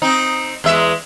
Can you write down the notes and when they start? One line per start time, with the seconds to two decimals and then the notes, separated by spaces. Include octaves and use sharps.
0.02 C4 D#4
0.64 E2 G#3 E5